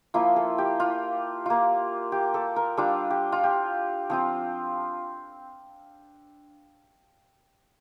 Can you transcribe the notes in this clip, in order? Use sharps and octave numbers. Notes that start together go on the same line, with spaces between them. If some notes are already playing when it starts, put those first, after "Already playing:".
F3 A#3 E4 F4
A4
G4
F4
A#3 F4
G4
A4
A#4
G3 D4 F4 A4
G4
F4
G4
F3 C4 F4